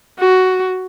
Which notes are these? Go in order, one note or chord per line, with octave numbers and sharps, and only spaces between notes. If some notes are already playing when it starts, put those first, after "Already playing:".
F#4